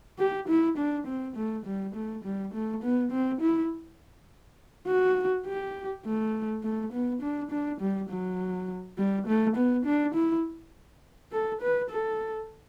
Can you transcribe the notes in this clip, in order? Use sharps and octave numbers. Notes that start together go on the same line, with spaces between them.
G4
E4
D4
C4
A3
G3
A3
G3
A3
B3
C4
E4
F#4
G4
A3
A3
B3
D4
D4
G3
F#3
G3
A3
B3
D4
E4
A4
B4
A4